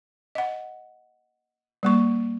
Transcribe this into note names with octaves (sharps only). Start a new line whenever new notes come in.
D#5 F#5
G3 A#3 C#6